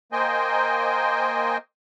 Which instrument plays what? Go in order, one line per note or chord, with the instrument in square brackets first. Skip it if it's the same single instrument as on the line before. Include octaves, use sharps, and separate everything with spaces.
[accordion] A#3 C5 D#5 G5 G#5